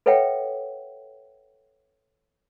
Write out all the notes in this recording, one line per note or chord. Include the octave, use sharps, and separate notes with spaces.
A4 B4 C#5 E5 F#5 G5